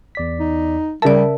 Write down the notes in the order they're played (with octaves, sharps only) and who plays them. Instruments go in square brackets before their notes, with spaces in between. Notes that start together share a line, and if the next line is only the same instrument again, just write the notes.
[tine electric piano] E2 D5 B6
[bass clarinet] D#4
[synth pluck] C#3 A5 [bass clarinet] G3 [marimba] A#4 D5 [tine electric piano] E5